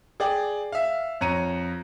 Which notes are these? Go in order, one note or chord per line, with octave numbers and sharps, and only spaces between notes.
G#4 D5 G5
E5 F5
F2 C#5 A#5 C#7 D#7